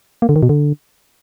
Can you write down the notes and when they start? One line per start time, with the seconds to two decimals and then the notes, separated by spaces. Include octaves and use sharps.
0.22 A#3
0.29 D3
0.36 D#3
0.43 B2
0.49 D3